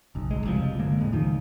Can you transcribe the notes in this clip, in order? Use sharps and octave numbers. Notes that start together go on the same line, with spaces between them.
F#1 B1
D1 A#1 G#3
F#1 C2 D3 F3
G1 D3 G#3 A#3
F2 A2 G#3
C#2 D#3 F3